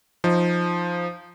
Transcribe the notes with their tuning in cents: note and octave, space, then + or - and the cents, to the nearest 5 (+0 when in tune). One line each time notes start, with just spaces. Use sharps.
F3 +0 D#4 +0